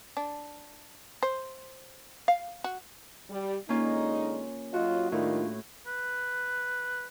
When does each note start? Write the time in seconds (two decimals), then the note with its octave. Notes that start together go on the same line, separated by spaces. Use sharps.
0.17 D4
1.23 C5
2.28 F5
2.64 F#4
3.30 G3
3.69 D3 G#3 A#3 C#4 D#4 F4
4.74 F#3 F4 F#4 D#5
5.12 A2 D#3 G3 D4 F4
5.87 B4